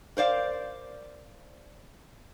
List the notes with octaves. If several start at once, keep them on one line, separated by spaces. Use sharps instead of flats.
A#4 C5 D5 F5